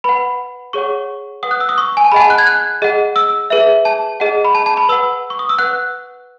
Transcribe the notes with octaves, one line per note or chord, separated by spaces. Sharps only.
B4 F#5 B5
G#4 C#5 F#5 C#6
B4 F#5 D#6
F#6
E6
D#6
C#6
G#5
A5
G#4 D#5 F#5 G#5 B5
A5
F#6
G#6
F#6
G#4 D#5 F#5
E6
G#4 B4 E5
A5
G#4 D#5 F#5
B5
A5
A5
B5
B4 F#5 E6
C#6
D#6
E6
B4 F#5 F#6